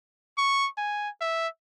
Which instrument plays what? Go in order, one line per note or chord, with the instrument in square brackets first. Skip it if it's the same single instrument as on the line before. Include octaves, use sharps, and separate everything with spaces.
[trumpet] C#6
G#5
E5